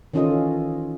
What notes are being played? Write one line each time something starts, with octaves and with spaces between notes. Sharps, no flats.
D#3 E3 C#4 F4 A4 D#5